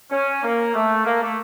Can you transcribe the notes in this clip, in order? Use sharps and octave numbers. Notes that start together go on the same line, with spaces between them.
C#4
A#3
A3
A#3
A3